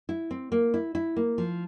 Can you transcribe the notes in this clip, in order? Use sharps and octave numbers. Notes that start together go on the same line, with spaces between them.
E4
C4
A#3
E4
E4
A#3
F3